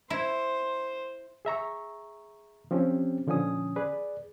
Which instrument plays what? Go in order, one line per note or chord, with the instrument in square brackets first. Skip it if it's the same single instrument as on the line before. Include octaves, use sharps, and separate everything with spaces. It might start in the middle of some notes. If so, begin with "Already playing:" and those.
[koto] E4 [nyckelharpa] C5
[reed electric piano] G#4 E5 A#5 C#6
F3 C4 C#4 G4
A#2 D3 F3 C#4 G#5 D#6
G#4 B4 D5